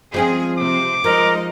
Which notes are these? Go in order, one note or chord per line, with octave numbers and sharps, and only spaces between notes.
F3 G#3 C4 C#4 G#4
C3 C5 D6
F3 G#3 D#4 A#4 D#5